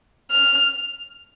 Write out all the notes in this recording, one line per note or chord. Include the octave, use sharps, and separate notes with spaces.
F6